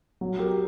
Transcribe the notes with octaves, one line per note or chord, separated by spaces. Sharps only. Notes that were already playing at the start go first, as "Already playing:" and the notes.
F#3
G4 A#4